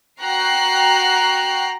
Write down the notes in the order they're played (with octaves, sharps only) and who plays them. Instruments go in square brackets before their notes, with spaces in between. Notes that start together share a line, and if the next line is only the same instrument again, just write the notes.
[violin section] F#4 G5 A#5 F#6 C7